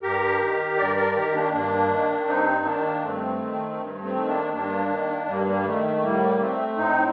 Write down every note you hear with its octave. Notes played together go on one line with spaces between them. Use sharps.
G2 G4 A#4
D#3
G2 A#4 D5
A#4 D5
D#3 G4 A#4
A#3 D4
G2 A#3 D4
D#3
G2 C4 D#4
D#3 A#3 D4
G2 A3 C4
D#3
G2
A3 C4
D#3
A#3 D4
G2 A#3 D4
D#3
G2 G3 A#3
G3 A#3
D#3 A3
A3
A2 G3 A#3
A3 C4
A2 C4 D#4